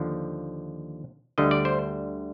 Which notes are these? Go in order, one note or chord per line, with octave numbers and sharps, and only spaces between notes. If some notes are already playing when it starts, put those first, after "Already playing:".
Already playing: D#2 D3 F3
D2 D3 G3 D#5
D5
C5